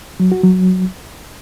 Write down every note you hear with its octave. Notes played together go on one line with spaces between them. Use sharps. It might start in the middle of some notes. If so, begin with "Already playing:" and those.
F#3
F#4
F#3